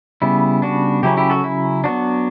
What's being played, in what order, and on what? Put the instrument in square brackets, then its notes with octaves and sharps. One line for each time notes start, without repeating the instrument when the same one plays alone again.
[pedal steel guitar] C#3 G3 B3 E4
D4 F#4
C#3 F#3 C#4 E4 G4
E4 G4
F#4 A4
E4
F#3 B3 D4 F#4